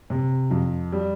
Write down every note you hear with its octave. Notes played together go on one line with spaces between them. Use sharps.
C3
F2
G3